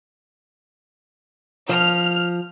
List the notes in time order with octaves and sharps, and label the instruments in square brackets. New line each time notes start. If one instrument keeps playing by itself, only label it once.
[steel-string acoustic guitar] F3 [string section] F6